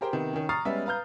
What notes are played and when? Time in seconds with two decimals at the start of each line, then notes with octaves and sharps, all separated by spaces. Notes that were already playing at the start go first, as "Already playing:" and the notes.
0.01 G4 G#4 A#4 C5 G5
0.13 C3 D#3 B3
0.33 D#3 C#4
0.49 A#5 C#6 D#6 F6 A6 C7
0.65 G3 G#3 B3 C#4 E5
0.86 B4 F5 A#5 F6 G6